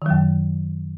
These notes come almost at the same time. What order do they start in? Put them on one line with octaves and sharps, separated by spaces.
D#3 F#3 F#2